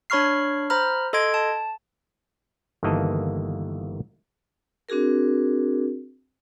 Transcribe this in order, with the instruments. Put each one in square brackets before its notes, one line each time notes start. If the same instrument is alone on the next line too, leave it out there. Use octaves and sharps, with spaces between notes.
[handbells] D4 C#5 B5 C#6 F6 C7
C5 A#5 B5 F6
A4 D#5 C6 G#6 D7
A5
[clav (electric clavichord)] G1 D#3 E3 A#3 D#5 A5
[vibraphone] C4 D4 F#4 G#4 A#4